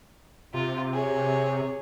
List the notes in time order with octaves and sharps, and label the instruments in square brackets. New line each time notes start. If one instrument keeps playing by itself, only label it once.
[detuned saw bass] C3 [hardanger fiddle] F4
[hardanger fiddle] G#4 C#5